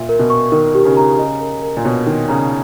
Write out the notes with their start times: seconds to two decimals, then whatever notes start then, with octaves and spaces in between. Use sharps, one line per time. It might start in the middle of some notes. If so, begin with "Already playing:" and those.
Already playing: A#2 E5
0.09 A#4
0.19 B2
0.30 C#6
0.52 D#3 A#4
0.74 G4
0.85 C#3
0.97 A#5
1.19 D#5
1.41 A#4
1.63 A#4
1.77 A#2
1.84 B2 C#5
2.06 D#3 A#4
2.28 C#3 A#5